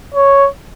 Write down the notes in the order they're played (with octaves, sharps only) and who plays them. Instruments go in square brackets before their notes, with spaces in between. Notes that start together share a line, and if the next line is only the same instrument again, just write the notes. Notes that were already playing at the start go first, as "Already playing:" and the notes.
[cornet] C#5